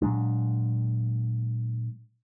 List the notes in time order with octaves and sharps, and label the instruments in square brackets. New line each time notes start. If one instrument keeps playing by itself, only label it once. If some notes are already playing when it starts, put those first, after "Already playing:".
[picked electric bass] A#2 F#3 G#3 D4